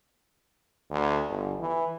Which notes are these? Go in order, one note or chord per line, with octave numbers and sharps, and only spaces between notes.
D2
G1
E3